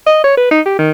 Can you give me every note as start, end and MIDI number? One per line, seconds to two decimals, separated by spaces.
0.07 0.23 75
0.24 0.37 73
0.37 0.50 71
0.51 0.61 63
0.66 0.75 67
0.79 0.91 51